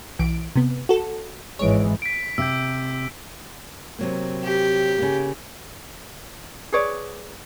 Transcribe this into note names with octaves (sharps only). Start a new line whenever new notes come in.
B1 E3 D7
C3 B3
F#4 A4
G#1 E3 G#3 C#5 D7
B6 D7
C3 E6 G6
C3 F#3 A#3
G4
C#3 A#3
G#4 B4 C#5 D5